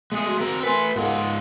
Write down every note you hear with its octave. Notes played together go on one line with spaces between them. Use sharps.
G#3 A3 G#4
F#4 C6
C4 A#4
A3 A#4 B4 G#5 C6
G#2 F4 G#4 A#4 F#5 C6